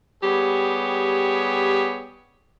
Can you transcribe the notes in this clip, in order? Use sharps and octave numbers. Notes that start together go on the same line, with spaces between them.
G3 B3 G4 G#4 C#5